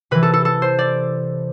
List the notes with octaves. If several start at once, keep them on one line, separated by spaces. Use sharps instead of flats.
C3 E3 B4
A4
A4
A4
C5
D5